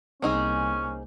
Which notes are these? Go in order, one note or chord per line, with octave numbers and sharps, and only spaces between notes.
C2 A#3 C4 C#4 D#4 G#4